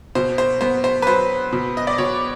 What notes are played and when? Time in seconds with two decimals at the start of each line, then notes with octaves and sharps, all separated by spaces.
0.15 B2 C5
0.38 C5
0.61 B3 C5
0.84 C5
1.02 B4
1.07 F#3 C5
1.52 B2
1.77 D#5
1.87 D5
1.98 B2 C#5